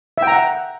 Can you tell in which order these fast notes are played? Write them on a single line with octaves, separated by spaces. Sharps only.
E5 G5 A#5 F#5